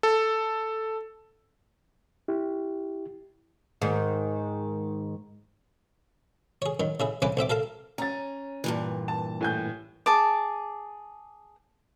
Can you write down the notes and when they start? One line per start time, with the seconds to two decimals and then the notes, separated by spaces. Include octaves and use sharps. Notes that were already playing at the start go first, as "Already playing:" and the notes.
0.03 A4
2.28 E4 G4
3.82 G#2 D#3
6.62 G#4 C#5
6.80 F#2 D#3
7.00 C#3 E4 G#4
7.22 C2 C#3 E3 B4 G#5 D6
7.37 B1 C4 E5 D6
7.50 A4 A#4 F5 A5
7.98 C#4 A#5 A6
8.64 G2 A#2 E3
9.08 A5
9.41 A2 G#5 G6
10.06 G#4 A5 D6